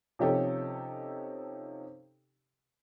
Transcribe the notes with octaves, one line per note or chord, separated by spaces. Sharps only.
C3 F3 C#4 D#4 G4 A4